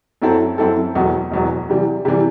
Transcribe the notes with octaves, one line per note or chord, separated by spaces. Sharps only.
F#2 F#3 C4 E4 A4
F#2 F#3 C4 E4 A4
E1 E2 B2 F#3
E1 E2 B2 F#3
C3 E3 G3
C3 E3 G3